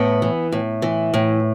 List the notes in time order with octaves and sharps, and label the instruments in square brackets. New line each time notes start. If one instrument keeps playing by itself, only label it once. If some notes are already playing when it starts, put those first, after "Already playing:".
Already playing: [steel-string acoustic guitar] A2 B3
E3
A2
E3
A2